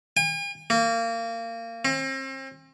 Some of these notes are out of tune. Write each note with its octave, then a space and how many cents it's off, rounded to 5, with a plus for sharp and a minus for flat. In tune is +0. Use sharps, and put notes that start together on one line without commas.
G#5 -45
A#3 -25
C4 +40